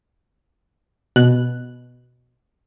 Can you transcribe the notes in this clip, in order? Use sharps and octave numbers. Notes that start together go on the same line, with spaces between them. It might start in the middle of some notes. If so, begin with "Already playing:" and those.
B2 F#6